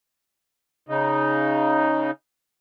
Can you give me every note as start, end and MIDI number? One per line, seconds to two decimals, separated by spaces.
0.89 2.11 49
0.89 2.11 63